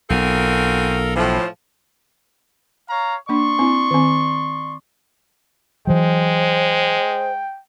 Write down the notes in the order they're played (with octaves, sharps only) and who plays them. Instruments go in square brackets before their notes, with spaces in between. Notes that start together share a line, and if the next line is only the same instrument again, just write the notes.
[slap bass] B1 [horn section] C4 F#4 G#5 [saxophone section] F4 A4 A#4
[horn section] A2 [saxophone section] E3 F3
[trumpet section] C#5 F5 A#5
[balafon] A#3 D4 [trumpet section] D5 C6 C#6
[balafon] C4 E4
D#3 C4
[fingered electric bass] E3 F#3 [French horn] G#3 [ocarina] C5 [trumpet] G5